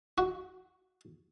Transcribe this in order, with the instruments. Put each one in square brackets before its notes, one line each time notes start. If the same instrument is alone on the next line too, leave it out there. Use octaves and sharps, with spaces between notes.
[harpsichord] F#4